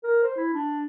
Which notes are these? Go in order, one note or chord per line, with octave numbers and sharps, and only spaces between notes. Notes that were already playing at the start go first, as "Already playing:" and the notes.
A#4
C5
E4
D4